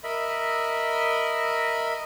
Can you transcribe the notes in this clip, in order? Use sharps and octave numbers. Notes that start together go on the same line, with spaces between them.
A#4 D#5 E5 B5